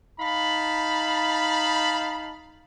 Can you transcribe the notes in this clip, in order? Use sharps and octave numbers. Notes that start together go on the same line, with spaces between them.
D#4 F5 A5 B5